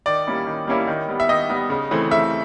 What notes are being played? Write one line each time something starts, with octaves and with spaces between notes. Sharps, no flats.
D#3 D5
G3 A#3 C#4 E4
D#3
G3 A#3 C#4 E4
D#3
G3 B3
E5
D#3 D#5
G3 B3
C#3
E3 A3 C4
C#3 E5